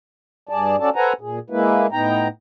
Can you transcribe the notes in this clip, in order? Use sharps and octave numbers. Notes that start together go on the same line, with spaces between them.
G2 G#4 D5 A5
C#4 F#4 A4 D5 A5
A4 B4 C5 F#5 G#5 A#5
A#2 G#4
G#3 A#3 E4 B4
A2 B3 D#4 G5 A#5